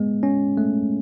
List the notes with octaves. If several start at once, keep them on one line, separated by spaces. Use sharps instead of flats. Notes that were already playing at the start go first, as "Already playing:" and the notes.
Already playing: G#3 B3
C#4
A3